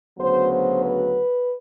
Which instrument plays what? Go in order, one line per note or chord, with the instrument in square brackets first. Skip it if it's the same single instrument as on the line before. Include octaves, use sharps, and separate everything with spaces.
[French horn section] D2 C#3 F#3 B3 C5
C5
B4